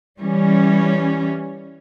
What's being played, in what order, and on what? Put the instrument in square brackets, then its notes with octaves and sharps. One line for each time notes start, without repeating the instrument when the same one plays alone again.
[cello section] E3 G3 C#4